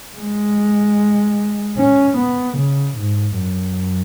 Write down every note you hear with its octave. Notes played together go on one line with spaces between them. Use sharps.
G#3
C#4
B3
C#3
G#2
F#2